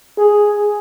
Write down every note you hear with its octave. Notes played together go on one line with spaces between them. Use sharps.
G#4